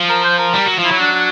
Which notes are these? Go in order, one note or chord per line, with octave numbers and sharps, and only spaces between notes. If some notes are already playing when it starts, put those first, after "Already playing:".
Already playing: F3
A#4
C5
A#4
G3
F#3
F3
E4
F#3
D4
D4